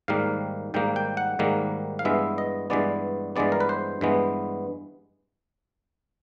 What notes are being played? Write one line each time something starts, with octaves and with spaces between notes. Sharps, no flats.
G#2 D#3 G3 A#3 F5
G#2 D#3 G3 A#3 G5
G5
F#5
G#2 D#3 G3 A#3
F5
G2 E3 G#3 B3 E5
D#5
G2 E3 G#3 B3 D5
G2 E3 G#3 B3 D5
A#4
B4
C5
G2 E3 G#3 B3